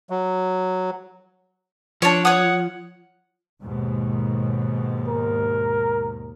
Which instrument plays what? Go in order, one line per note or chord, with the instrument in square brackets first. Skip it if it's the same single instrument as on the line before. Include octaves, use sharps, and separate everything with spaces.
[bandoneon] F#3
[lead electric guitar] F3 [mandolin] D4 C#5
[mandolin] C#5 D#6 [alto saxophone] F#5
[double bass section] D#2 G#2 B2
[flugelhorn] A#4